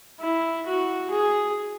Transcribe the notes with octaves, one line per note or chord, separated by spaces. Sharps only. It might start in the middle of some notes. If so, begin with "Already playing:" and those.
E4
F#4
G#4